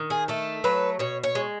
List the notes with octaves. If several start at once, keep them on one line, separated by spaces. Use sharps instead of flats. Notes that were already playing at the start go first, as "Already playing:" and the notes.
Already playing: D#3
G#4
A3 A4
F#3 B4
B2 C#5
C#5
G#3